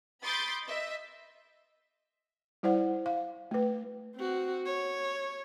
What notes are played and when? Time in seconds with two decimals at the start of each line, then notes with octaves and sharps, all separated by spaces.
0.23 B5 C6 D6 D#6 G6 A6
0.65 D#5 E5
2.63 G3 E4 C5 D5 F#5
3.06 F5
3.51 A3 B4
4.15 C4 F#4
4.66 C#5